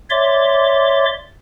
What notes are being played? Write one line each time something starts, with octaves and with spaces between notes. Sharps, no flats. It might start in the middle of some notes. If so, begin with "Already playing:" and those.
C#5 D5 E5 C6 D6